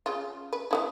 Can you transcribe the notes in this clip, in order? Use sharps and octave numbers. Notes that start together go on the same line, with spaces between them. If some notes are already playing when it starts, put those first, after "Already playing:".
C#3 F4
B4
B3 D#4 E4